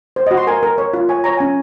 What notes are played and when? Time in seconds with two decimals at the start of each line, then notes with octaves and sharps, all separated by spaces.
0.16 C5
0.27 F#4 D#5
0.37 C6
0.47 A#4 G#5
0.63 A#4
0.78 C#5
0.94 F4
1.09 C#5 G#5
1.24 C#5 A#5
1.37 C#4 G#5